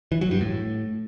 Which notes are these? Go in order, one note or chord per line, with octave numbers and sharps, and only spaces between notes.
E3
F#3
G2
A2